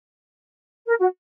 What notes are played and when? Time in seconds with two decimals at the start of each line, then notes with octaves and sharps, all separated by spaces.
0.87 A#4
1.00 F#4